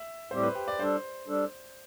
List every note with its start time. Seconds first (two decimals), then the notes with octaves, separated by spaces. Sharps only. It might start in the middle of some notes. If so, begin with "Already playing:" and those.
Already playing: E5
0.31 A2 G3 C4 G4 C5
0.43 B4
0.55 G4
0.68 D5
0.79 G3 D4 A4 C5
1.28 G3 D4 A4